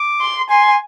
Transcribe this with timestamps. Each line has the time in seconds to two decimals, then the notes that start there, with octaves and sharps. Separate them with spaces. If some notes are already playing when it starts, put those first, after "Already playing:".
Already playing: D6
0.21 C6
0.50 G#5 C6